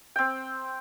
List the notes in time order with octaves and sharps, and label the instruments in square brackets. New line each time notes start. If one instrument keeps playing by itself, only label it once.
[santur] C4 G5